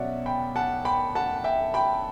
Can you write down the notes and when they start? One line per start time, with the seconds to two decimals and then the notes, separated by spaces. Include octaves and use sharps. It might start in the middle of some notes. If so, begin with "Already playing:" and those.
Already playing: B2 F#3 C#4 C#5 D5 E5 F#5
0.26 G5 B5
0.56 F#5 A5
0.85 G5 B5
1.15 F#5 A5
1.44 E5 G5
1.74 G5 B5